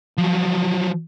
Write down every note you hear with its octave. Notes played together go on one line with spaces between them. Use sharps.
F3 F#3